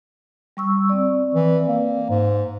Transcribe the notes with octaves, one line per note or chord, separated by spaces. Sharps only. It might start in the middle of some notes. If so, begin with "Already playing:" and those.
G3 C#6 E6
C4 D5
E3
A#3
G#2